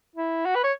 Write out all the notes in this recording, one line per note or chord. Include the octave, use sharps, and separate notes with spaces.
E4
F#4
B4
C#5